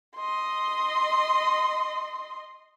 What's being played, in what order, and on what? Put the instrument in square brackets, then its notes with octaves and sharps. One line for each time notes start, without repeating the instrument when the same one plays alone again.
[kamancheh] D#5 C6